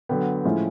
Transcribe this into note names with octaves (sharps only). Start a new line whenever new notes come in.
D3 F#3 B3 G5
A2 F3 G#3 C#4 E4